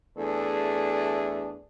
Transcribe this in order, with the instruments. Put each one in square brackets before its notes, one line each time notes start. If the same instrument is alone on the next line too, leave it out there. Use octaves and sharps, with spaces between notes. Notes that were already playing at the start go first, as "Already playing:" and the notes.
[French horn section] E2 A3 D4 G#4 A4